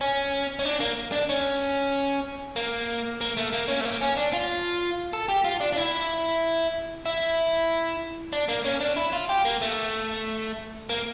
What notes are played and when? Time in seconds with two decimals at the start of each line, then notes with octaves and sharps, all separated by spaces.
0.01 C#4
0.59 C#4
0.65 D4
0.80 A#3
1.12 D4
1.29 C#4
2.56 A#3
3.21 A#3
3.37 A3
3.53 A#3
3.68 C#4
3.81 A3
3.85 A#3
4.01 C#4
4.17 D4
4.33 F4
5.13 A4
5.29 G4
5.45 F4
5.60 D4
5.73 D4
5.77 E4
7.06 E4
8.33 D4
8.48 A#3
8.65 C#4
8.81 D4
8.96 E4
9.13 F4
9.29 G4
9.45 A#3
9.61 A3
10.89 A#3